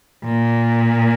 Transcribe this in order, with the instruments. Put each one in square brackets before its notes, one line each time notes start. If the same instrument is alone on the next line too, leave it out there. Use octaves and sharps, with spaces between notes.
[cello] A#2